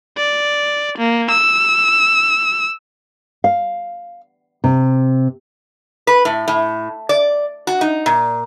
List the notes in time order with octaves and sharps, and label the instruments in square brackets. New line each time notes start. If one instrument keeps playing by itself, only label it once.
[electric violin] D5
A#3
E6
[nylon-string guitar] F5
C3
[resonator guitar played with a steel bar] B4
A2
A2
D5
F#4
D#4
A#2